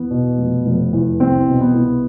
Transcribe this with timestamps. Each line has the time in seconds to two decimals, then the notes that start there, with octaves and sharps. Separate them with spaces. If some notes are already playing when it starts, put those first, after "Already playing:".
Already playing: E2 B3
0.11 B2
0.38 F1
0.66 F1
0.93 E2
1.20 C2 C4
1.48 B2
1.61 B3
1.74 C2